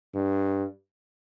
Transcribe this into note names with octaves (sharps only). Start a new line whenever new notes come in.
G2